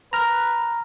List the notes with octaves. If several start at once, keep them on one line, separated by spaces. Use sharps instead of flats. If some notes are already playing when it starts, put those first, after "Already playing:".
B4 A#5 F6